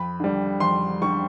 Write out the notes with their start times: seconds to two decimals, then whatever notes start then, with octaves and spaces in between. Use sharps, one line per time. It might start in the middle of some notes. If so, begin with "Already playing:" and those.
Already playing: F2 B5
0.20 D3 G3
0.60 F2 C6
1.02 D3 G3 C#6